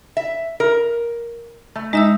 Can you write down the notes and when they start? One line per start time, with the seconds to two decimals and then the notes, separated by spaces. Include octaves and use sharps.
0.17 E5
0.60 A#4
1.76 A3
1.93 G#3 D#4 E5 E6